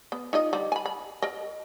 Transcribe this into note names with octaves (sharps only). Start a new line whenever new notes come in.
B3
D#4 F4 D#5
D3 G3
G#5 B5
B5
A#4 D#5